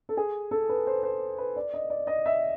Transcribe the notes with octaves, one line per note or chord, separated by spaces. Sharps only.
A4
G#4
A4
B4
C5
C5
B4
D5
D#5
D5
D#5
E5